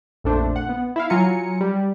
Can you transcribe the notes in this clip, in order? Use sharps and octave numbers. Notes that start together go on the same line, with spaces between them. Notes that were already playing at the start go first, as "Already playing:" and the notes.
A#1 F2 A3 D4 C5
F#5
B3
E4 E5 F5
F#3 F4 G#5 A#5 C#7
G3